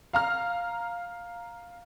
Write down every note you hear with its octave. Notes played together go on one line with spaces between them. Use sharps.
F5 A#5 F6